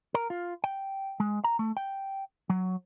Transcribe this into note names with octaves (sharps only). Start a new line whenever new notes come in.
A#4
F4
G5
G#3
A#5
A3
G5
F#3